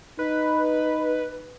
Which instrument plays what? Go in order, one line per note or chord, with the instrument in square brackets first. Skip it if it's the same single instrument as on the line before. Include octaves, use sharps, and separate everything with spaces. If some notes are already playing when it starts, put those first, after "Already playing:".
[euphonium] D#4 [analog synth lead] B4